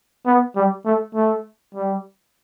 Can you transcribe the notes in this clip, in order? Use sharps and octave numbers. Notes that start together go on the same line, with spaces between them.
B3
G3
A3
A3
G3